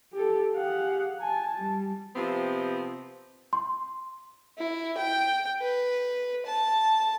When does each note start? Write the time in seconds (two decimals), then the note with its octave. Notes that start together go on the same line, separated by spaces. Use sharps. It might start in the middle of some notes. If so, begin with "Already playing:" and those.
0.13 G4 A4
0.55 G4 G#4 F5 F#5
1.21 G#5 A5
1.57 G3
2.16 C3 F3 B3 C4
3.53 C6
4.58 E4
4.97 G5
5.61 B4
6.46 A5